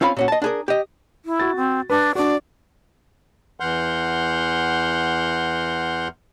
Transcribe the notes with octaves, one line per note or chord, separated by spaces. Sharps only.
C4 C#4 F4 F5 B5
A#2 C#4 F#4
D#5 A5
D4 G#4 A#4
G4 D#5
E4
F#4 A6
C4
D4 B4
D4 F#4 D5
E2 E3 F#5 C6 F6 G6